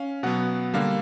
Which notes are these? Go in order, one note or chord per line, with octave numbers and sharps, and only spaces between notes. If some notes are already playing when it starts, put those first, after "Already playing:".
Already playing: C#4 F5
B2 F#3 B3 F#5
D3 G3 A#3 F5